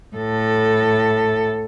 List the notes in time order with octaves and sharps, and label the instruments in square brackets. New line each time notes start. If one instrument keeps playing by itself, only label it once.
[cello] A2 A4